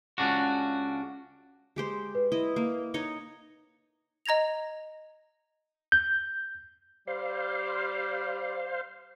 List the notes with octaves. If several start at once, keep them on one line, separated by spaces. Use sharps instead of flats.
C#2 C#3 D4 F#4
G#3 G4 C5
B4
E4 D#5
A#3
D#4 C#5 D#5
D#5 A#5 G#6 A#6 F7
G6
G3 C5 F5